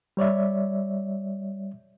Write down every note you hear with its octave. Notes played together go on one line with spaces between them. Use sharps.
G3 C#5 D5 E5